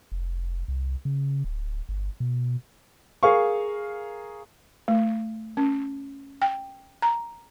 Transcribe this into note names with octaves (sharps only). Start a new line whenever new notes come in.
F1
C2
C#3
D1
G1
B2
G#4 A#4 F5 C#6
A3
C#4
G5
A#5